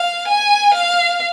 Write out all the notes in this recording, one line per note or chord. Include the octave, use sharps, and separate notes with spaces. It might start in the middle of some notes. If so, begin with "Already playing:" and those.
Already playing: F5
G#5
F5